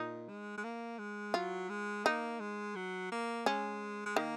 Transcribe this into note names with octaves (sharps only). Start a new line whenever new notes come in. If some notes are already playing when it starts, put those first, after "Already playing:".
Already playing: A#2 D#4
G#3
G#3
A#3
G#3
F#3 F4
G#3
A#3 D#4
G#3
F#3
A#3
G#3 C#4
G#3
D#3 A#3